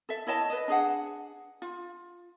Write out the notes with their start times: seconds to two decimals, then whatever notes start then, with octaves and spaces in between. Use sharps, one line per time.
0.09 A4 E5
0.27 E4 C#5 D#5 A5
0.50 B4 D#5
0.68 D4 G#4 F#5
1.62 F4